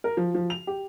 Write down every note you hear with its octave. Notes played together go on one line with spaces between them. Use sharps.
A#4
F3
F3
F7
G4